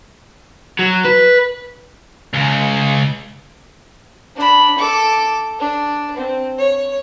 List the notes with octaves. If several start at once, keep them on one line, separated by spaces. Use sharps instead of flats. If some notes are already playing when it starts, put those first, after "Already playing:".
F#3
B4
C#2 C#3
D4 B5
A4 D6
D4
C4
C#5